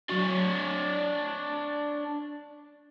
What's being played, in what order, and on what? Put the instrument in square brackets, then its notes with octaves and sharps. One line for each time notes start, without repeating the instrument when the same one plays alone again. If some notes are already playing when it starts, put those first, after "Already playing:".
[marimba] F#3 F#4 [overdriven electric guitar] D4 C#5